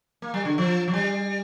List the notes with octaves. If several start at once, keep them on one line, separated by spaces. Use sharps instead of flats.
A#3
G3
D3
F3
F3
G3